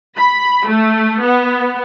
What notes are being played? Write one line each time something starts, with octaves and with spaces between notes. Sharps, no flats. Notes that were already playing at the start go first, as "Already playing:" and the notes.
B5
A3
B3